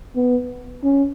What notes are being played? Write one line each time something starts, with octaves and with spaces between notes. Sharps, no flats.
B3
C#4